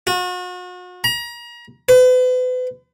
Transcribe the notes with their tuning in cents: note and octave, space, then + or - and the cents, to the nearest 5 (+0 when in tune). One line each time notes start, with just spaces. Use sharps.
F#4 -40
A#5 +35
B4 +40